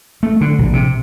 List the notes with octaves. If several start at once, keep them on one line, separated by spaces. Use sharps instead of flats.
A3
D3
A#1
C3